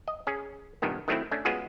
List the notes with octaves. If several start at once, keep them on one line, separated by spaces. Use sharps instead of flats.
D#5
C#4 G#4
C2 G2 A#2 D#3 B3
D#3 F#3 A3 C4 E4
A3 C#4 D4
G#3 B3 C#4 F4 F#4 G#4